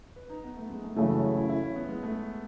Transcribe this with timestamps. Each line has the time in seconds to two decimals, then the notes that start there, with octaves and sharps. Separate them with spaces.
0.16 B4
0.30 D#4
0.44 B3
0.57 A3
0.70 G#3
0.84 A3
0.96 F#2 C#3 E3 A3 F#4
1.10 F#4
1.23 E4
1.36 E4
1.49 E4
1.63 C#4
1.75 B3
1.89 G#3
2.03 A3